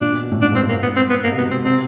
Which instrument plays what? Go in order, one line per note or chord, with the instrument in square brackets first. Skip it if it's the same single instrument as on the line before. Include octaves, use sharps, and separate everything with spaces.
[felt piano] A#2 [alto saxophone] D4
[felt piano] B2
B2
A2
[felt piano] G#2 [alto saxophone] D4
[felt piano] G2
[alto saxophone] C4
[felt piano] G2
[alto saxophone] A#3
[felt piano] G#2
[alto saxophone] B3
C4
B3
[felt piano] G#2 [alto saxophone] A#3
[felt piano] C3
[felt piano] B2 [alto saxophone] B3
[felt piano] B2 [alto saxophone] C4
[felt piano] C3 [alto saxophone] C4